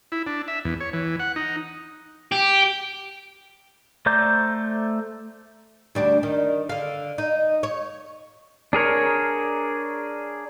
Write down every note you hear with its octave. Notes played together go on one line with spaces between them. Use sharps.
E4
D4
E5
E2
C#5
E3
F#5
D#4
G4
A3 C5 D5 A#5 G6
D2 G3 D4
D#3
D3 F5
D#4
C#5
D4 G#4 A#4 C#5